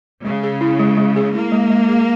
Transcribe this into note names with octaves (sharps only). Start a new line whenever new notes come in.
C#3 G#3
G#4
E4
G#3
G#3
G#4
A#3 E4
G#3
G#3
G#4